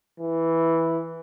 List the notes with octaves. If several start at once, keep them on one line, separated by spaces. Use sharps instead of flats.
E3